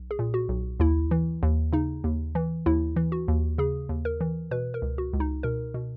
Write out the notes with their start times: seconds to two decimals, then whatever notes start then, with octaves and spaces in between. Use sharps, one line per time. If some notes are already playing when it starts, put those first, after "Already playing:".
Already playing: B1
0.11 G#4
0.19 A#2
0.34 F#4
0.49 B1
0.80 D#2 E4
1.11 E3
1.43 D#2
1.72 C#3 D#4
2.04 D#2
2.35 E3
2.66 D#2 E4
2.96 E3
3.12 F#4
3.28 D#2
3.58 C#3 G#4
3.89 D#2
4.05 A#4
4.21 E3
4.51 B2 B4
4.74 A#4
4.82 C#2
4.98 F#4
5.13 C#2
5.20 D#4
5.43 B2 A#4
5.74 B2